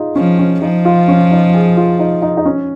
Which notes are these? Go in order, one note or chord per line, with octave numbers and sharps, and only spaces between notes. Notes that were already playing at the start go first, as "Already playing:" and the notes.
Already playing: D#4 F4 G#4
F3 C#4
C#4
F3 D#4
F4
C#4
D#4
G#4
F4
D#4
D#4
D#4
C#4